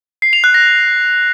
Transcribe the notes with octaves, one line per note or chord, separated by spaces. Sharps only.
C7
F7
F#6
A#6